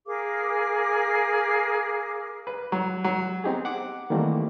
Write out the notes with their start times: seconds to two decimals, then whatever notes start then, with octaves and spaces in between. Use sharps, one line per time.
0.06 G#4 A#4 F5 D6
2.47 B4
2.72 F#3
3.04 F#3
3.44 B3 C4 D#4 G4 G#4
3.65 F#5 D6
4.10 D#3 E3 G3 A3 A#3 C4